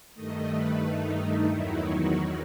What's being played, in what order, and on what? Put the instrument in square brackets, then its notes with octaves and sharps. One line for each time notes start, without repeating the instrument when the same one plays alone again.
[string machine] G2 D#3 A3 D#5
B4
D#4
E2 D#3 F#3 E4
F#4